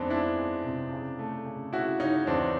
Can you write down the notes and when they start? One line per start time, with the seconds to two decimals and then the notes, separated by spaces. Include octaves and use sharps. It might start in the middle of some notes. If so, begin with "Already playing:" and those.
Already playing: F2 F3 G#3 B3 C4 D4 D#4
0.10 G#3 D4 E4
0.37 G#3
0.64 C3
0.92 C#3
1.19 A3
1.46 C#3
1.73 C#3 E4 F#4
2.00 C#3 C#4 D#4
2.27 E2 C4 D4